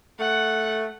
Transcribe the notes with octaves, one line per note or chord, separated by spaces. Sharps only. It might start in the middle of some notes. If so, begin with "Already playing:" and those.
A3 F#5